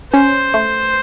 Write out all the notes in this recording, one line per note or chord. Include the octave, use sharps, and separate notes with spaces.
C#4 C5
A3